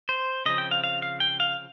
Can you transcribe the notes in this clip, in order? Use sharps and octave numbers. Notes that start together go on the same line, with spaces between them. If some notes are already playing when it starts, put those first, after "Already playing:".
C5
C#3 F3 C4 D#5
G5
F5
F5
F5
G5
F5